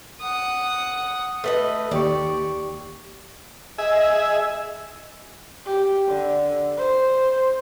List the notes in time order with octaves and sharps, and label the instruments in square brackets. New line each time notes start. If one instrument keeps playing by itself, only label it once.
[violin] F#5 D#6
[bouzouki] A3 B4 D#5
[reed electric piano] D#2 G4 C#6 [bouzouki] D5
[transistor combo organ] G#4 E5 [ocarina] D#5
[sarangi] G4
D3
C5